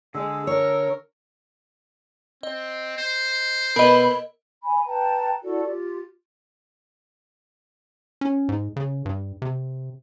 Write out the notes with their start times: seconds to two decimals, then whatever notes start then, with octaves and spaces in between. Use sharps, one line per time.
0.15 D3 G#3 E6
0.47 A#4 C#5
2.43 C4 D#5
2.98 C5
3.76 B2 A#4 B4 D#5 B5
4.62 G#5 B5
4.86 B4 G5 A5 A#5
5.43 E4 F#4 A4 D5
5.64 F4 G4
8.21 C#4
8.49 G#2
8.76 C#3
9.05 G2
9.42 C3